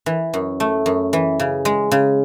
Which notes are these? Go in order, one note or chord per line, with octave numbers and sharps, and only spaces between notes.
E3
F#2
A3
F#2
E3
C#3
G#3
C#3